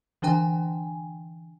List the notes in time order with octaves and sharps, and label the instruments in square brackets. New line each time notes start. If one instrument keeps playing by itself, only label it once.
[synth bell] D3 E3 D4 G5 G#5